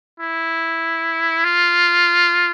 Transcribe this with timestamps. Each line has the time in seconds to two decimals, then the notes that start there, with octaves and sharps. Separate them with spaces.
0.20 E4
1.44 F4